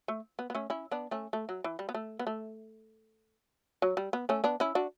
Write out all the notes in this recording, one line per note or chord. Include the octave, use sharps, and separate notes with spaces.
A3
B3
B3
A3 C#4
C#4 E4
B3 D4
A3 C#4
A3
F#3
E3
G3
B3
A3
B3
A3
F#3
G3
B3
A3 C#4
B3 D4
C#4 E4
D4 F#4